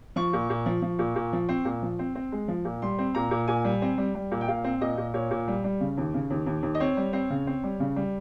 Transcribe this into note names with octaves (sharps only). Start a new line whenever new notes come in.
F3 C#6
A#2
A#2
F3
F3
A#2
A#2
F3
C4
A#2
F3
C4
C4
G#3
F3
A#2
G3 C6
C4
A#2 A#5
A#2
A#2 G#5
G3
C4
G3
G3
A#2
G5
A#2 F5
C4
A#2 D#5
A#2
A#2 C#5
A#2
G3
G3
C#3
D#2
C#3
D#2
D#2
D#2
D#5
C4 C#5
G3
C4
C#3
C4
G3
C#3
G3